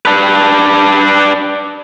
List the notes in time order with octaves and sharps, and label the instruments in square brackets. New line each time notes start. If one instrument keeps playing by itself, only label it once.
[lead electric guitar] D4 B4